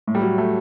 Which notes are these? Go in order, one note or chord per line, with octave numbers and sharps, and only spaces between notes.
A2
G3
F#3
A3